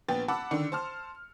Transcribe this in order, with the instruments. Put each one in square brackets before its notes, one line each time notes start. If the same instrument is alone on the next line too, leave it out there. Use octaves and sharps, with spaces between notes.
[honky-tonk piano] A#1 B3 G5 A6
F#5 A5 B5 D6 E6
D3 D#3 D5 C#7
C5 A5 F6